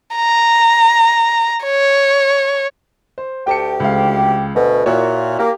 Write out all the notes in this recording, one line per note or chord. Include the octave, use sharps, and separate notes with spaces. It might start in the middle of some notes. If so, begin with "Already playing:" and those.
A#5
C#5
C5
D2 G4 G5 A5 C#7
C#2 F5
D2 B2
A#2 E4 F#4 C#5
A#3 G4